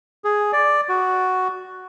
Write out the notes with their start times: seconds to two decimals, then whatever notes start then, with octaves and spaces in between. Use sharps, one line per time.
0.24 G#4
0.53 D5
0.89 F#4